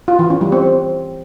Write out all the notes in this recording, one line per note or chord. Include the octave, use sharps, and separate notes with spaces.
F4
E3
C#4
G3
C4